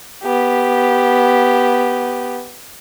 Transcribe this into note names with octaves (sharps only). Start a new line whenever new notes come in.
B3 G4